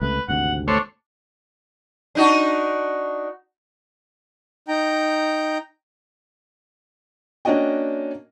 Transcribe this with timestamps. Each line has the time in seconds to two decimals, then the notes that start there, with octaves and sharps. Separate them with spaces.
0.02 C#2 C3 A3 B4
0.28 G#1 D2 C3 F#5
0.68 A3 D4 C5 C#5
2.15 D4 D#4 F#4
4.68 D#4 G5 A#5
7.45 A#3 C#4 D4 F#4 D#5 G5